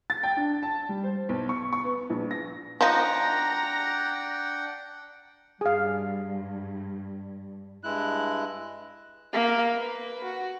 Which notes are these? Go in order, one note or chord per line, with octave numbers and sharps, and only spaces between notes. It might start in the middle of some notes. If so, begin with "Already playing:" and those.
A6
G5
D4
A5
G3
C5
B1
C#6
C#6
B3
A#1
A#6
F3 D4 D#4 F#5 G5 A#5 A#6
G2 G#4 F5
G2 G#3 E4 F#6
A#3
B4
F#4